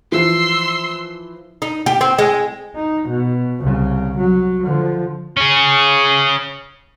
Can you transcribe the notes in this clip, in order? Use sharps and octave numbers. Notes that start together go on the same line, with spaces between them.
E3 F3 C6 E6 C7
D#4
G4
C4
G#3
D#4
B2
C2 C#3
F#3
D3 F3
C#4 G#4